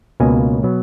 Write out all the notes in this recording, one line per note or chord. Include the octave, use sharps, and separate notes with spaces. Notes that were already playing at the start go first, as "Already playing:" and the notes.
C#2 B2 A#3 G#5
B2 F#3 B3